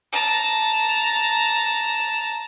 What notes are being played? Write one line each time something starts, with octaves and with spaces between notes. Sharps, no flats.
A5 A#5